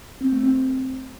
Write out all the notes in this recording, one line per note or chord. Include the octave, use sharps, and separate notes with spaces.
C4
A3
C4